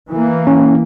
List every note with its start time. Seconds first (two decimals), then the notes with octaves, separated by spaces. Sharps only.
0.10 E3 A#3
0.47 C#4